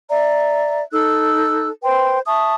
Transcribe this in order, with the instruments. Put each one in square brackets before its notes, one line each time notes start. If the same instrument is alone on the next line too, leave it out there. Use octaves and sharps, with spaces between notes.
[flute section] D5 E5 A#5
D#4 A4 E6 F#6
B4 C5 G5 C6
E5 A5 C#6 D#6